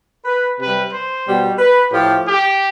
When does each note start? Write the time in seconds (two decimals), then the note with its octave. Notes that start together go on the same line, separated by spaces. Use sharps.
0.25 B4
0.59 C3 G3 B4
0.92 C5
1.25 B2 G3
1.59 B4
1.91 A2 F3 G4
2.26 G4